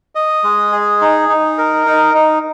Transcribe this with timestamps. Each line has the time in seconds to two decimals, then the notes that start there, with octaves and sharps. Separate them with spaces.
0.15 D#5
0.44 G#3
0.72 G#4
1.01 D#4
1.29 D#4
1.58 A#4
1.86 D#4
2.14 D#4